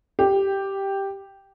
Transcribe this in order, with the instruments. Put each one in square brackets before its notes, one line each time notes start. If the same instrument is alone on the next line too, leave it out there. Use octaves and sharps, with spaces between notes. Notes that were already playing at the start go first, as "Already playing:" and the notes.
[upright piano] G4